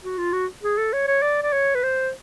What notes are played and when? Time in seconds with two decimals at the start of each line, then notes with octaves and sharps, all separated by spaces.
0.03 F#4
0.18 F4
0.33 F#4
0.63 G#4
0.78 A4
0.93 C#5
1.07 C#5
1.22 D5
1.43 D5
1.53 C#5
1.75 B4
1.83 C5